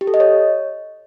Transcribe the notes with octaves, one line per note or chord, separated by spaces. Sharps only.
G4
A4
D#5
C#5